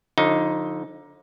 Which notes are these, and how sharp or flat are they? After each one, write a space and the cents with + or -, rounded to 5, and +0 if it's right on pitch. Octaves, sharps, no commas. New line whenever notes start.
D3 +0 F3 +35 D#4 +10